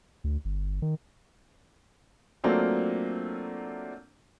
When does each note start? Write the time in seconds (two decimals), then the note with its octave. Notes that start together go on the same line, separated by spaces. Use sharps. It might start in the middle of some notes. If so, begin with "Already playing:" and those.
0.24 D2
0.45 G1
0.82 D#3
2.44 F#3 A3 A#3 C4 D4 F4